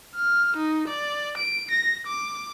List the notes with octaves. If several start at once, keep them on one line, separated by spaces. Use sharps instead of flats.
F6
D#4
D5
D7
A#6
D6